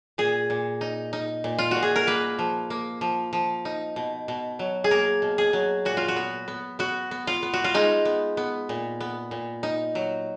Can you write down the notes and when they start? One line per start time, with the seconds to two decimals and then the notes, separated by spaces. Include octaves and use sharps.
0.18 A#2 G#4
0.50 A#2
0.81 D#4
1.13 D#4
1.44 A#2
1.58 F4
1.71 A#2 F#4
1.82 G#4
1.96 A#4
2.07 A#3 B4
2.39 F3
2.70 A#3
3.01 F3
3.33 F3
3.65 D#4
3.96 B2
4.28 B2
4.59 F#3
4.84 G#4
4.91 A#3 A#4
5.22 B2
5.38 G#4
5.53 F#3
5.85 A#2 F#4
5.97 F4
6.08 F#4
6.16 B3
6.48 B3
6.79 B3 F#4
7.11 B3
7.27 F4
7.43 B3
7.54 F#4
7.64 F4
7.74 G#3 D#4
8.05 B3
8.37 B3
8.69 A#2
9.00 B3
9.31 A#2
9.63 D#4
9.95 F#3